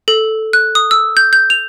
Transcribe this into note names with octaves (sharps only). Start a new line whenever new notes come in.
A4
F#6
D#6
E6
G6
G6
F7